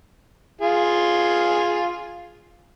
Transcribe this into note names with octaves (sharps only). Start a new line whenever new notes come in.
F4 G#4